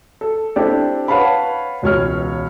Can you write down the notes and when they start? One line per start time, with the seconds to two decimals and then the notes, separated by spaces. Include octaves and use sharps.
0.21 A4
0.56 C4 D4 E4 G4 A4 D5
1.08 B4 C#5 F5 F#5 A5 B5
1.82 E1 C#2 C#5 F6